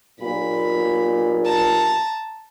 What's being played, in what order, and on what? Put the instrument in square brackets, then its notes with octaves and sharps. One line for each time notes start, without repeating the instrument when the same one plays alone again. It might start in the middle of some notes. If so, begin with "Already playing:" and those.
[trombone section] B1 G2 A#2 [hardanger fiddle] B5
[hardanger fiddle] A5 A#5